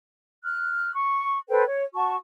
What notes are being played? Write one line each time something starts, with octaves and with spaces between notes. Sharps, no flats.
F6 F#6
C#6
A4 B4 C5 G5
C#5
F#4 A5 C#6